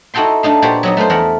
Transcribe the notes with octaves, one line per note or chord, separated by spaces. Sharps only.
D#4 E4 F#4 A4 G5 C6
A3 D4 D#4 F5
A#2 F#4 G4 B4 C5 D5
F#3 B3 D#4
A3 F4 B4 C5
E2 A3 A#4 F#5